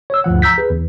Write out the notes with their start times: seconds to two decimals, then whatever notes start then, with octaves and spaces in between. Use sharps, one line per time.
0.10 C#5 E6
0.24 D2 G2 F3 F#5
0.42 A#5 E6 G6 B6
0.58 G#4 B4
0.70 E2